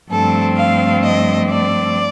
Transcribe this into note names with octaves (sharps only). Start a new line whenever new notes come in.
G2 F3 A3 C4 A4
F5
D#5
D5